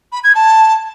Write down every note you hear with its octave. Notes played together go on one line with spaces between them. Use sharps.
B5
G#6
A5